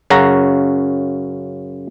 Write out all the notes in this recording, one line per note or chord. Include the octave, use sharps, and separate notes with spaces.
F#2 C#3 F#4 A#5